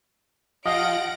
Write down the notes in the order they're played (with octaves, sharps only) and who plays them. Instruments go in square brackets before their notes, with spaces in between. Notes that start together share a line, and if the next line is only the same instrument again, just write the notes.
[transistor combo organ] F3 F4 G4 [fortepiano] D#5 [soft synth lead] F5 [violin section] F#5 A#6 D7